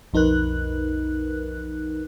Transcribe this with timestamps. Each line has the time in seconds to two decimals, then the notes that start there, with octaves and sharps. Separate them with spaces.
0.13 B1 F2 D#4 A#4 B4 F#6